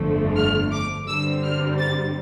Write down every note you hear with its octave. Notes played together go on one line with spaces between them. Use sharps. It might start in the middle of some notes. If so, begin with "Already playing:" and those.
Already playing: G1 F2 D3 F3 A3
F6
D6
G2 D3 G3 C4 E6
F6
A6